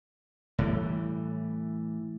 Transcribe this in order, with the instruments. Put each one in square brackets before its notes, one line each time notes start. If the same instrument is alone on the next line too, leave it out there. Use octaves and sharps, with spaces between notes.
[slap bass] A2 E3 G3